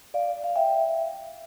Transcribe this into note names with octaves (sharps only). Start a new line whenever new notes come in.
D5 F5
F5
E5 G5